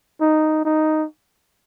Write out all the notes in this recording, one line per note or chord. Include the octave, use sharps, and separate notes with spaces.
D#4
D#4